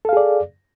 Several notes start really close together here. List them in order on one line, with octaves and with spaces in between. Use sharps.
A4 F5 G#4 D5